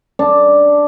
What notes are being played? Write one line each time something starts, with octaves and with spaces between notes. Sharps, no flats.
D4